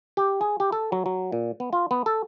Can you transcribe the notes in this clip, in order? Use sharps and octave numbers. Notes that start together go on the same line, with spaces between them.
G4
G#4
G4
A4
F#3
F#3
A#2
B3
F4
B3
A4